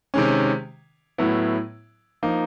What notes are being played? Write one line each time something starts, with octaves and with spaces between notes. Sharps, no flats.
C3 D#3 G#3 C#4
A2 F#3 B3 E4
F3 A#3 D#4